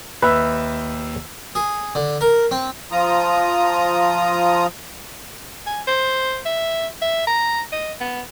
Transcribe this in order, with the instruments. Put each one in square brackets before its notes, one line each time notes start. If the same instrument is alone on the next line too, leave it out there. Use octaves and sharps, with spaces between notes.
[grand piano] D#2 E5 E6 [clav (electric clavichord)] B4
[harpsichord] G#4
D3
A#4
C4
[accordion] F3 F4 A#5 D#6
[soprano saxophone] G#5
C5
E5
E5
A#5
D#5
B3